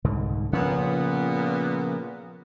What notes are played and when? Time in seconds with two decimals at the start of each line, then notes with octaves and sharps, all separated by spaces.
0.04 C2 G#2 D3
0.53 A#2 C#3 F3 B3 C#4